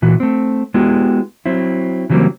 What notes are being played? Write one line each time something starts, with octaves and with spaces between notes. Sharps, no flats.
A#2 E3 F#4
A3 C4
G#3 B3 E4 F#4 G4
F#3 C4 E4
C#3 E3 F#3 G3 A#3 C4